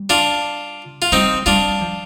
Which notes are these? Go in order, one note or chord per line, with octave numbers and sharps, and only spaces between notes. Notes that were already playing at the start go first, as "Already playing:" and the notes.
Already playing: G3
D4 F4
F4
G3 C4 D#4
G3 D4 F4
F3